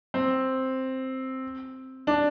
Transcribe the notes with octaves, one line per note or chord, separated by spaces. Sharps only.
C4
D4